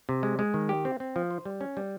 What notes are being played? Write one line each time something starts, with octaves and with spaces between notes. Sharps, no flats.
C3
G#3
G#3
D#3
G4
C4
C4
F3
C5
G3
C#4
G3